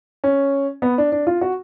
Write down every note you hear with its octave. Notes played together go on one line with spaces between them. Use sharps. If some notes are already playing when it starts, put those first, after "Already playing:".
C#4
B3
D4
D4
F4
F#4